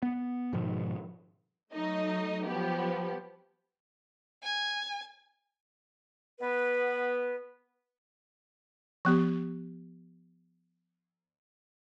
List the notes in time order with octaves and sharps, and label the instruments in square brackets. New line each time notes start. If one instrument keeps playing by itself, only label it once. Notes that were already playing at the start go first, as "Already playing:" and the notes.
[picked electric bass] B3
G#2 B2 D#3 F3
[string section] F#3 A3 D#4 D#5
F3 F#3 B3 G4
[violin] G#5
[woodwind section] B3 B4
[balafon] F3 B3 G4